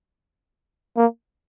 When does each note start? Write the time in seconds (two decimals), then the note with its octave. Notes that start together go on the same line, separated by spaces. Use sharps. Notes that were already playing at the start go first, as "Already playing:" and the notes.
0.97 A#3